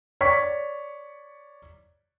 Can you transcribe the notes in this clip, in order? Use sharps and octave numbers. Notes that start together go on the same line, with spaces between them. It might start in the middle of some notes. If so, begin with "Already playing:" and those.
C#5 D5 C#6 B6